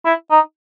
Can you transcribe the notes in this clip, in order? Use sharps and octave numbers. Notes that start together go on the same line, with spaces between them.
E4
D#4